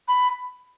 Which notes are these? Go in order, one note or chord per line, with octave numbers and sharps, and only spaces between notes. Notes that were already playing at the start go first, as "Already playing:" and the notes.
B5